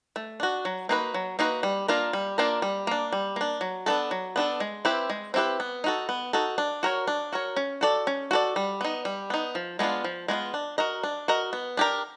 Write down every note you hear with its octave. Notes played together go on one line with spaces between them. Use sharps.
A3
D4 F#4
F#3
A#3 D#4 F#4 B4
F#3
A#3 D#4 F#4 B4
G3
A#3 D4 F4 A#4
G3
A#3 D4 F4 A#4
G3
A#3 D4
G3
A#3 D4
F#3
B3 D4 F#4 A4
F#3
B3 D4 F#4 A4
G#3
C4 E4 G4 B4
G#3
C4 E4 G4 B4
B3
D#4 F#4 A4
B3
D#4 F#4 A4
D4
F#4 A#4 C#5
D4
F#4 A#4 C#5
C#4
F#4 A4 D5
C#4
F#4 A4 D5
G3
B3 D#4
G3
B3 D#4
F3
G#3 B3 D4 F4
F3
G#3 B3 D4 F4
D4
F#4 A#4 D#5
D4
F#4 A#4 D#5
B3
D4 G4 A#4